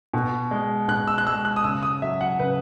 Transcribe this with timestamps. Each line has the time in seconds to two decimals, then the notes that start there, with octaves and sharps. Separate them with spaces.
0.14 B2
0.51 G#3
0.88 B2 F#6
1.08 E6
1.18 F#6
1.26 G#3 E6
1.45 F#6
1.56 D#6
1.64 C#3 E6
1.83 D#6
2.02 F#3 E5
2.21 F#5
2.39 C#3 B4